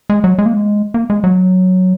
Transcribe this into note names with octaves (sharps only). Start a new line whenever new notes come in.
G#3
F#3
G#3
A#3
G#3
A#3
G#3
F#3